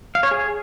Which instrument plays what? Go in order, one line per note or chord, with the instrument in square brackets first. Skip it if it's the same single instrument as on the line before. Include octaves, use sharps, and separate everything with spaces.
[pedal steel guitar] F5
C#5
G#4